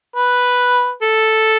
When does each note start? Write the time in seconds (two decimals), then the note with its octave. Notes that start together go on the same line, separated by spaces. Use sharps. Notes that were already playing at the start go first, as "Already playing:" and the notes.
0.16 B4
1.02 A4